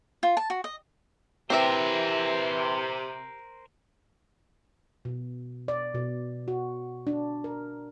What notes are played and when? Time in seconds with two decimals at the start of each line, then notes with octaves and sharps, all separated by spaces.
0.23 F4
0.37 A5
0.50 F#4
0.64 D#5
1.50 C3 E3 C4 G4 A#4 C5 E5
5.05 B2
5.68 D5
5.95 B2
6.48 F#4
7.07 D4
7.44 A#4